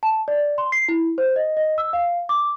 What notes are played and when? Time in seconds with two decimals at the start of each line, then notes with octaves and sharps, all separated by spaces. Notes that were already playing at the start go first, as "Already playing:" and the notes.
0.03 A5
0.28 D5
0.58 C6
0.72 C7
0.88 E4
1.18 C5
1.36 D#5
1.57 D#5
1.78 E6
1.93 F5
2.29 D6